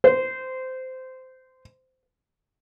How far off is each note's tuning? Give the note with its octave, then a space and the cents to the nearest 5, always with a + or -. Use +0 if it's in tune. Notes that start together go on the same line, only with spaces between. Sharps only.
C5 -15